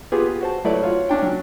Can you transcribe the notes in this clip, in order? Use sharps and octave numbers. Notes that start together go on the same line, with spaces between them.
B3 F4 G4 G#4 B4
F#4 C5 A5
F#3 A3 E4 B4 C#5 D5
F4 F#4 C#5 F5
C#4 D4 G5
F#3